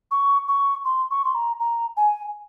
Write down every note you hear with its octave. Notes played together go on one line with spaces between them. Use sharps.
C#6
C#6
C6
C#6
C6
A#5
A#5
G#5